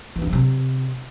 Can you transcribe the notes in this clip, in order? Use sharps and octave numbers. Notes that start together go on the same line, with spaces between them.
E3
D4
F#3
C3